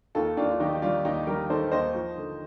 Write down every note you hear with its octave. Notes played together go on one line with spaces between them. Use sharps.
D#2 F4 A4
D#2 D4 F4
F4
D#3 D#4 G4
G4
G3 D4 F4
D#2 D#4 G4
G3 G4 A#4
D#3 A4 C5
D#2 C5 D#5
F3
D3